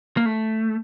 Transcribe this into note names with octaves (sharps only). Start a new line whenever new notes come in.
A#3
A3